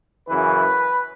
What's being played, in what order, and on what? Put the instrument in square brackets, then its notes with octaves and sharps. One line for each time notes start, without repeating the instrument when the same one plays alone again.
[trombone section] F#2 C#3 E3 B4